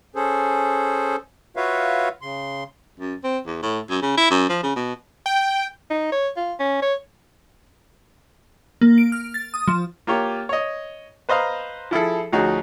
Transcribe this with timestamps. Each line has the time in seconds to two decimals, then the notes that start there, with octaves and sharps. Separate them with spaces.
0.16 C#4 G#4 A4 C5
1.56 F4 F#4 B4 C#5 E5 F5
2.22 C#3 C6
3.00 F#2
3.24 C4
3.46 E2
3.62 A2
3.90 F#2
4.02 C#3
4.17 E4
4.30 F#2
4.49 F3
4.63 C#3
4.76 B2
5.26 G5
5.91 D#4
6.12 C#5
6.37 F4
6.60 C#4
6.82 C#5
8.81 A#3
8.98 D7
9.12 F6
9.34 A6
9.54 D#6
9.68 F3
10.07 A#3 F4 G4 C#5
10.49 C#5 D#5
11.29 B4 C5 D#5 F5 A#5
11.91 F3 E4 G#4 A4
12.32 D2 F3 C#4 D#4 F#4 G#4